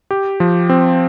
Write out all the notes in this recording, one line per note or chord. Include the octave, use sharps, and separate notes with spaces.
G4
F3
C4